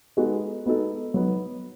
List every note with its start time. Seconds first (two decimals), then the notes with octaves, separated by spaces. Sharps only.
0.17 G#3 B3 D#4 F#4 A4
0.66 G#3 B3 D#4 F#4 A4
1.14 F#3 B3 D#4